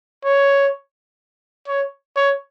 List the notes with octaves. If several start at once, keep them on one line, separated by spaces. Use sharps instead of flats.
C#5
C#5
C#5